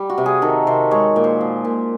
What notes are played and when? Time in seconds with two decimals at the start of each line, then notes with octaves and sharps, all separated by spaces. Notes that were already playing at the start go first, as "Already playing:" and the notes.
Already playing: G3
0.10 F#4
0.18 C3
0.26 G#4
0.42 D#3 A4
0.67 C3 C5
0.91 G#3 C#5
1.16 A#2
1.24 C5
1.41 F3
1.65 A#2